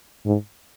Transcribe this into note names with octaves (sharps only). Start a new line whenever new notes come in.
G#2